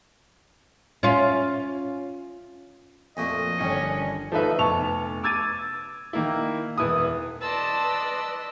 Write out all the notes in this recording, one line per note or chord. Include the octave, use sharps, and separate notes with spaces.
C#4 F4
F2 A#2 A3 F#4 D#5 C#6
G1 D#3 C#4 D4 D#7
F3 A3 D#4 B4 E5
F1 B3 A5 C#6 F7
D6 E6 G#6 A6 D#7
D#3 A#3 E4
E1 E4 B4 D#6
B4 D5 D#5 A5 C6 E6